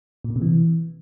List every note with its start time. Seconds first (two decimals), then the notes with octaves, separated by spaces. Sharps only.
0.24 A#2
0.30 B2
0.36 C3
0.42 E3